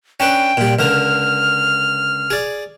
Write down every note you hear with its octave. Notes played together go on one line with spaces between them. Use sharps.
C#4 D4 B4 G5
A#2 G3
C#2 D3 A#4 F6
G#4 D5